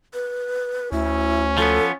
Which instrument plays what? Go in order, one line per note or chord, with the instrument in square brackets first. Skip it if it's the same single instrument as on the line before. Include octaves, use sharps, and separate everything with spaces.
[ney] B4
[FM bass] D2 [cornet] C#4 [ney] E4
[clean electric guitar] F3 B3 [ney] A4